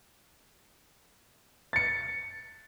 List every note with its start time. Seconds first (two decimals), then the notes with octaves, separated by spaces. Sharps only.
1.73 A6 C#7